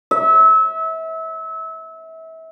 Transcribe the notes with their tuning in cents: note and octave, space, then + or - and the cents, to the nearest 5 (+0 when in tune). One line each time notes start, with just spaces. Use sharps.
E5 -30